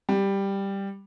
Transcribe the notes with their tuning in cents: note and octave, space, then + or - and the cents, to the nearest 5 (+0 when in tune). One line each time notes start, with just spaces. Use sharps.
G3 +5